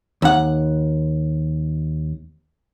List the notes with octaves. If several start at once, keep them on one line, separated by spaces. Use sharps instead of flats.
D#2 F#5